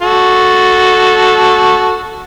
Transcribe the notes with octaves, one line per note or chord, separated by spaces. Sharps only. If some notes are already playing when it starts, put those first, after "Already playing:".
F#4 A4